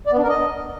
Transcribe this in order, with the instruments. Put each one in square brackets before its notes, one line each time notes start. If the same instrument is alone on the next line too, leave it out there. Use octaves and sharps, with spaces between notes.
[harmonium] D5
B3
D4
A#4
D#5